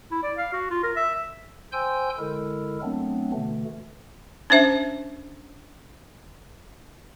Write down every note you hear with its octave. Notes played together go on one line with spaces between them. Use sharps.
E4
D5
F5
F#4
F4
A#4
E5
C5 G5 G#5 C6 E6 G6
D3 G#3 E4 A4 A#4
F#3 A3 B3 C4 D4
B2 D3 E3 A3
C#4 D4 C5 E5